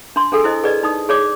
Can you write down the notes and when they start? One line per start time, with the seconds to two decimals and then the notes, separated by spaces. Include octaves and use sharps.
0.16 D4 C6
0.32 D4 G#4 A4 G#5 D#6 E6
0.44 E4 C5 D#5
0.64 G#4 B4 D5 D#5
0.83 D#4 D#6
1.09 G#4 C#5 D5 D6